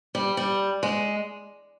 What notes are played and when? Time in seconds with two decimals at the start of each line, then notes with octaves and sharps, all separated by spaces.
0.15 G3
0.37 G3
0.83 G#3